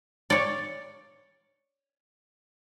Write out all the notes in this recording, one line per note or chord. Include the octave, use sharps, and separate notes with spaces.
C#5 D5